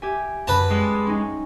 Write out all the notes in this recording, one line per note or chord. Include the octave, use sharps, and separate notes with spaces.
G4 E5 G#5
F#2 B4 A5
G3 G#3
C#4 D#4